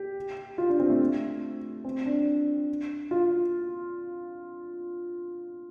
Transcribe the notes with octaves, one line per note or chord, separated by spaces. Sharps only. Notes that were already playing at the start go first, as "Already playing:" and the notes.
Already playing: G4
F4
D4
C4
A3
C4
D4
F4